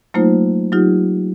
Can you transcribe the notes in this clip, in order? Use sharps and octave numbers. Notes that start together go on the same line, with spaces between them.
F#3 A3 A#3 D#4 F4 C5
F#3 D#4 F4 G4